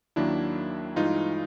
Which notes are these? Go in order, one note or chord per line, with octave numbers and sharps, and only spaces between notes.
D#2 D#3 F#3 A#3 D4 E4
G2 E3 G#3 D#4 F4